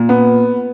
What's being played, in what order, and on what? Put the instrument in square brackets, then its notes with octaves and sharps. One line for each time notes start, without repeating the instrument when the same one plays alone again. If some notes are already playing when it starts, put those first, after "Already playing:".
Already playing: [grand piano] A#2
B3